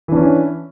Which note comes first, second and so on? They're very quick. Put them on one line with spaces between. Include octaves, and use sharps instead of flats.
E3 D4 C#4